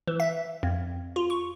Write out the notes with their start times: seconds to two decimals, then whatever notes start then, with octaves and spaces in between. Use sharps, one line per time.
0.08 E3
0.20 E5
0.63 F2
1.16 F4
1.30 C#6